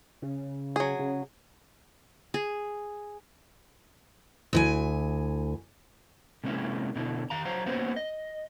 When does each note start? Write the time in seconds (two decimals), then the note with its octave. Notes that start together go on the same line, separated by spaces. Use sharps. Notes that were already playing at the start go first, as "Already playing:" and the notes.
0.22 C#3
0.76 F#3 G#4
0.99 C#3
2.34 G#4
4.53 D2 E4 G#5
6.44 C3 G#3 A#3 C#4 E4
6.96 B2 D3 E4
7.30 D#3 F5 A#5
7.45 F#3 C5 F5 A#5
7.66 A#3 B3 C#4 F#4 C5
7.96 D#5